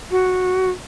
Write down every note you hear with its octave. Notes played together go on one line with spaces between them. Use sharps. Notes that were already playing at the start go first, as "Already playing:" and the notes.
F#4